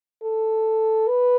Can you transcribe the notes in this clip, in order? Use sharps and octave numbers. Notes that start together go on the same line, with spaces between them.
A4
B4